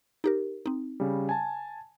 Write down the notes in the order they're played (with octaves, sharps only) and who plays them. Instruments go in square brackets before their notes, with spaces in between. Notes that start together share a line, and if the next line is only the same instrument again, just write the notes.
[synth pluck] D#4 G4 A#4
C4 D#4
[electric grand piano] C#3 G3
G#5 A5